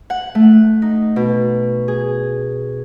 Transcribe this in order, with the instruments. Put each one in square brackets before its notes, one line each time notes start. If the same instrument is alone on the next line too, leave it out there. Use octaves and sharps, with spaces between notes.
[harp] F#5
A3
D#4
B2
G#4